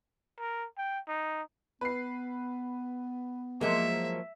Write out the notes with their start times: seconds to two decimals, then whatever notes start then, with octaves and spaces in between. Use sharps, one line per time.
0.39 A#4
0.78 G5
1.08 D#4
1.81 B3 B4 C7
3.61 F3 F#3 G#3 A#3 E5